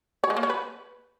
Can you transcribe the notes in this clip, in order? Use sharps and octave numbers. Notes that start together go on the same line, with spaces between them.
C#5
G#3
A#3
C#5
B4